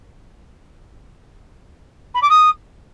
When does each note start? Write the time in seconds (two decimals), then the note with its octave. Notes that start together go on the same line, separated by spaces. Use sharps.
2.14 B5
2.22 D6
2.30 D#6